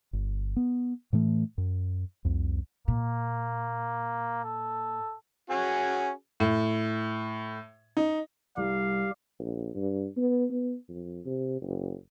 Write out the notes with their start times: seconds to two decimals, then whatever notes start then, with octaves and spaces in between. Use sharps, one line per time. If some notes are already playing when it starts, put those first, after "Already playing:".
0.13 G1
0.56 B3
1.13 A2 E3 A3
1.58 F#2
2.25 C2 F2
2.88 A#2 A#3
4.44 A4
5.50 C#4 F#4 G#4
6.40 A2
7.97 D#4
8.57 C2 G3 G4 F5
9.39 A#1
9.75 G2
10.17 B3
10.50 B3
10.89 F2
11.26 C3
11.61 F#1